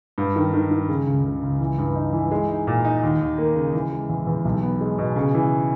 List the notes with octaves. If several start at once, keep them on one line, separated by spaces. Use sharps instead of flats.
G2
D#3
D#3
D#3
C#3
C#2
C#2
C#2
E3
G2
D#4
E3
G#3
D#4
A#2
D#4
D#2
D#2
A#3
C#3
E3
G#3
E2
E2
B1
B3
G#3
B2
C#3
E3